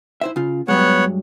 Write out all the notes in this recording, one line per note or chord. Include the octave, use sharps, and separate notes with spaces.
E4 C5 E5
C#3 F4
G2 F#3 G#3 B3 C#5 F#5